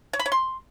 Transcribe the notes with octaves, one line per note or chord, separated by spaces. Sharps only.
C#5
B5
C#5
C6